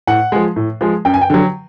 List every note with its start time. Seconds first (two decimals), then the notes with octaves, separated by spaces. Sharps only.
0.07 A2 F#5
0.32 F3 G#3
0.56 A2
0.81 F3 G#3
1.05 F#2 G5
1.14 G#5
1.21 G5
1.30 D3 F#3